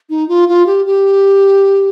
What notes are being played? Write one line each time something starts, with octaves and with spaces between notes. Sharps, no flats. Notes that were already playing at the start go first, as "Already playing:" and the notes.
D#4
F4
F4
G4
G4